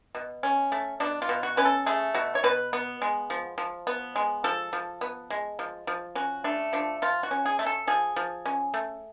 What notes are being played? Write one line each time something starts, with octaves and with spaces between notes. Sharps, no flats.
B2
C#4
A3
B2 D4
F4
B2
F#4
C#4 B4
A4
A3 G#4
B2 F#4
C#5
B2 B4
B3
G#3
F3
F3
B3
G#3
F3 A4
F3
B3
G#3
F3
F3
C#4 F#4
A3 D4
F3 D4
F3 F4
F#4
C#4
G#4
A3
A4
F3 G#4
F3
C#4
A3